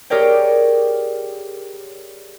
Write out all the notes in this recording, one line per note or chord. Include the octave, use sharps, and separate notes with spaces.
G4 G#4 A#4 C#5 D5 G5